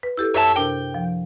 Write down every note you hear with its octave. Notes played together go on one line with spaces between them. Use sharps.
B4
E4 G4 A4
F#2 C#5 E5 A5
C3 D4 A#4 G5
F3